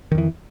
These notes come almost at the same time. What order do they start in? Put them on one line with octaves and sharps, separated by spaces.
D#3 F2 E3